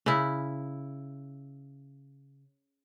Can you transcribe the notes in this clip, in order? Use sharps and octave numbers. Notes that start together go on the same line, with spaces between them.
C#3 E4